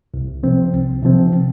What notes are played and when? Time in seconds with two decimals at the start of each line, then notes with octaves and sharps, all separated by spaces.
0.14 C2
0.43 C3 F3 C4
0.73 C2
1.02 C3 F3 C4